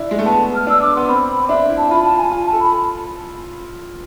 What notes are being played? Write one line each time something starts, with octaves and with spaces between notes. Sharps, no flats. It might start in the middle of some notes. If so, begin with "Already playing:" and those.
Already playing: D4 E4
G#3
A3
B3 A5
F6
D4 E6
D6
B3 C6
C4 B5
D4 E5
E4
A5
F4 B5
A5
G#5
F4 G#5
A5
A4
B5